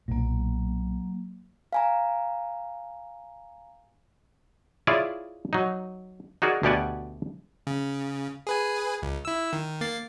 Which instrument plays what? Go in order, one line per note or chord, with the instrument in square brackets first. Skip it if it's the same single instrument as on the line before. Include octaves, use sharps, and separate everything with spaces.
[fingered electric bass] B1 A#2 [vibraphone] F#3 A#3
[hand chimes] F5 G#5 A#5
[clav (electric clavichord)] E4 F4 G#4 C#5 D5 E5
F#3 D#4
D#4 F#4 G#4 A#4 D5
D2 B2 G4 D5 F#5 G#5
[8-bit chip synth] C#3
G#4 B4 G#5
C#2
E4 E6
D#3
A#3 A6 C7